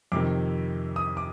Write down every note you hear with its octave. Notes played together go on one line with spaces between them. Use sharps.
F2 C3 D#3 D6
D#6
D6